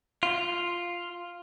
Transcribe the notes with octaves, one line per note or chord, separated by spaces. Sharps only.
F4